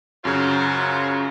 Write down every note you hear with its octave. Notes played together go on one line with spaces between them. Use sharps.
F#2 C#3 F#3 F4 C5